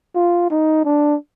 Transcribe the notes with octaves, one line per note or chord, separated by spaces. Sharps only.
F4
D#4
D4